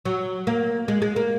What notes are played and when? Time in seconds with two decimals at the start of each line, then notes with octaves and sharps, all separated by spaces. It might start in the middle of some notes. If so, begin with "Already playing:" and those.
0.05 F#3
0.47 A#3
0.88 G#3
1.02 G#3
1.16 A#3